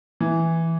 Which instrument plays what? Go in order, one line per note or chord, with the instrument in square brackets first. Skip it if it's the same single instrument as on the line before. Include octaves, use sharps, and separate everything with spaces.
[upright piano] E3